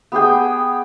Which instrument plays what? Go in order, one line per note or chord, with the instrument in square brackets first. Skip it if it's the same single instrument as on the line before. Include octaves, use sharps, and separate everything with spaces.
[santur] B3 G4 G#4 G5